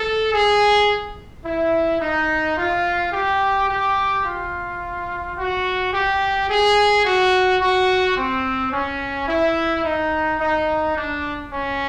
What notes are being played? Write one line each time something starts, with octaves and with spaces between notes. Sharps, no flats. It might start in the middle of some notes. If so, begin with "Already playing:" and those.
Already playing: A4
G#4
E4
D#4
F4
G4
G4
F4
F#4
G4
G#4
F#4
F#4
C4
C#4
E4
D#4
D#4
D4
C#4